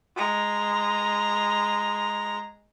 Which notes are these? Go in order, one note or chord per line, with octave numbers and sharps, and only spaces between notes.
G#3 A#5